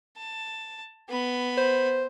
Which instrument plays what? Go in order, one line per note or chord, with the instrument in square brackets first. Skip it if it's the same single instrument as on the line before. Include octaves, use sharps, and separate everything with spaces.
[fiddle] A5
B3 B5
[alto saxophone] C5